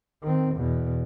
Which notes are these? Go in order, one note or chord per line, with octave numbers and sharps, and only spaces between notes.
D#3 C4
E2 B2